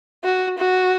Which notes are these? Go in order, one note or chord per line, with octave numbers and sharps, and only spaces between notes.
F#4
F#4